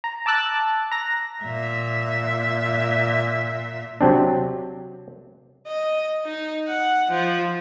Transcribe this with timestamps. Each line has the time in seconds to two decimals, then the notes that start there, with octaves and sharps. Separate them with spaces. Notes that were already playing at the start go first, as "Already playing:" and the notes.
0.04 A#5
0.26 A5 D6 E6 F#6 A6
0.91 A#5 A#6
1.44 A#2 E5
4.01 C3 F#3 C4 D4
5.67 D#5
6.26 D#4
6.68 F#5
7.11 F3